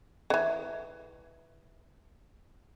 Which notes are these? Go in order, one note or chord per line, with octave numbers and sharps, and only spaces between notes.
D3 E3